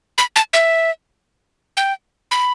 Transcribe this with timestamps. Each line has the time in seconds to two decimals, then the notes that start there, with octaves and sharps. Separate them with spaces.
0.18 B5
0.36 A5
0.53 E5
1.77 G5
2.31 B5